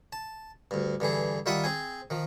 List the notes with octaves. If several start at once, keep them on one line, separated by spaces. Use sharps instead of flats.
A5
D2 G2
G2 D3 E3 G#4
D#3 G3 F4 E5 F#5 D#6
C4 G#4 G#5
D#3 F3